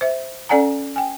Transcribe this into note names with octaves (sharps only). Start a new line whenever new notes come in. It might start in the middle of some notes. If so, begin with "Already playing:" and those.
C5 E5
C#4 A4 D5 F#5 G#5 A#5
G5 G#5